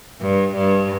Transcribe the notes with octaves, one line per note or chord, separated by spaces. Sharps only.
G2
G2